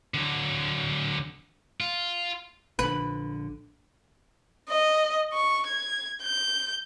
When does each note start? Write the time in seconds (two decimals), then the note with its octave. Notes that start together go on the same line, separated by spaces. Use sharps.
0.14 D3 F#3
1.80 F4
2.79 A#1 D3 B4
4.69 D#5
5.33 C#6
5.67 G#6
6.23 G6